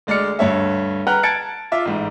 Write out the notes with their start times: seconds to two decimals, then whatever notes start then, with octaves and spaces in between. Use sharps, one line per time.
0.07 D2 G#3 D5 F6 C#7
0.39 D2 G2 C#5 E5
1.07 B4 F#5 G5 A#5 F6 F#6
1.23 A5 F#6 G#6 A6 C#7 D7
1.72 F4 E5 D6
1.85 A1 G#2